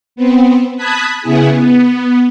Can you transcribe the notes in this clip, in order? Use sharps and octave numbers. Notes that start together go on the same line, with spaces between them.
B3 C4
A5 B5 D#6 F#6 G#6 B6
C#3 B3 E4 G#4
B3